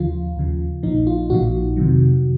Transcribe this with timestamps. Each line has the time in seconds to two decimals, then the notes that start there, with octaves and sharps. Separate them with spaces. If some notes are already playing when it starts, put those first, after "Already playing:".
Already playing: D#2 C#3 F3 F4
0.36 D#2 C#3 F3
0.83 A#1 A#2 F3 D#4
1.07 F4
1.30 A#1 A#2 F3 F#4
1.77 F2 C3 D#3 F#3